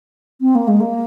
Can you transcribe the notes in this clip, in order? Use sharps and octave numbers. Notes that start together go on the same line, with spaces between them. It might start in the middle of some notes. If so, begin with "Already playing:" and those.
C4
A#3
G#3
A#3